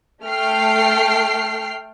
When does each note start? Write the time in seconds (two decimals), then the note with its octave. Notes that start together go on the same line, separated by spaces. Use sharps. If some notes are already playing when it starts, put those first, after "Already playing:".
0.24 A3 A4 G5 F6 C7